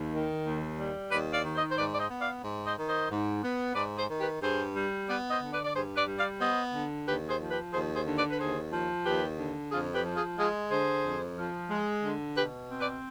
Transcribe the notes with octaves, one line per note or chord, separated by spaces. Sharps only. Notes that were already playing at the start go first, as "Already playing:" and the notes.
Already playing: D#2
D#3
D#2
G3
D#2 B4 D5
D5 F5
D#3
C5 D#5
C5
G#2 B4 D5
D5
C5 D#5
B3
D5 F5
G#2
C5 D#5
D#3
C5 D#5
G#2
B3
G#2 B4 D5
G#4 C5
D#3
G4 B4
G2 G#4 C5
G3
B3 B4 D5
C5 D#5
D3
B4 D5
D5
G2 G#4 C5
B4 D5
G3
D5 F5
B3 C5 D#5
D3
D#2 G4 B4
G#4 C5
F3
G4 B4
D#2 G#4 C5
G#4 C5
D3
B4 D5
B4
D#2 G#4 C5
F3
D#2 G4 B4
D3
F2 F4 G#4
G4 B4
F3
F4 G#4
G#3 F4 G#4
D3 G#4 C5
F2
F3
G#3
D3
B2 G4 B4
C4
B4 D5